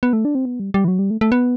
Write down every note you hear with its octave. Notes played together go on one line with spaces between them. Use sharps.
B3
A3
D4
C4
B3
G3
G3
E3
F#3
G3
A3
A3
B3